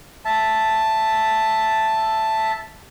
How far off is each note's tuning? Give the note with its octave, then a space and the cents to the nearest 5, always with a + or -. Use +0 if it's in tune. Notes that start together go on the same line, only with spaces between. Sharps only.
E5 +0 A5 +0